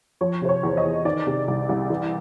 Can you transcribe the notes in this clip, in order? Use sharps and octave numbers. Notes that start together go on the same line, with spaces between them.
F3 C#5
C3 C5
C#5
E2
D#5
E2
D#3 D5
C3
C2
C2
E3